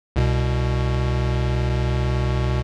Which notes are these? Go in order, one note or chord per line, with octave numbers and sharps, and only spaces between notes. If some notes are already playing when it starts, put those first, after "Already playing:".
C2 B2